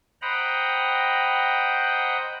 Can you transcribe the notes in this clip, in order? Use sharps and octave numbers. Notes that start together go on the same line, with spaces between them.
C5 D#5 F#5 G5 A#5 B5